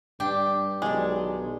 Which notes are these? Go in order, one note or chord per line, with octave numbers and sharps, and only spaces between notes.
G2 D4 G4
B1 D#3 G#3 D4